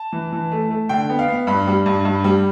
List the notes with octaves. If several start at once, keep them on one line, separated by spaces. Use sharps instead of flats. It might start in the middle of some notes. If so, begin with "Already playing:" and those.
Already playing: A5
E3
E3
A3
A3
D3 G5
B3
F5
B3
G2 B5
G3
G2
G2
G3